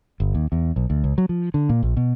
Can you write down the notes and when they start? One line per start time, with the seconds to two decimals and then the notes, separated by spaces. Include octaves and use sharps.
0.20 G1
0.35 D#2
0.52 E2
0.76 B1
0.90 D2
1.04 C#2
1.18 F#3
1.29 F3
1.54 D3
1.69 A#2
1.83 A#1
1.97 B2